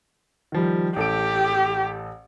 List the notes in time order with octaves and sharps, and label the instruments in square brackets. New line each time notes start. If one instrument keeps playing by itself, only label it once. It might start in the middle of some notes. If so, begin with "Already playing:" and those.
[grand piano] D#3 F3 G3
[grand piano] A1 A4 D7 [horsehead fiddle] G4